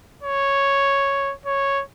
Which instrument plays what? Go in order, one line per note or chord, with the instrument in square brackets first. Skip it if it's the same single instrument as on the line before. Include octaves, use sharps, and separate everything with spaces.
[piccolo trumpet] C#5
C#5